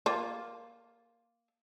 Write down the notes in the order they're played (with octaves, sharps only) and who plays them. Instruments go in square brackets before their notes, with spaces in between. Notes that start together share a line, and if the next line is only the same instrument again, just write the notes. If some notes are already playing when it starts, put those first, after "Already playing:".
[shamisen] A#3 F4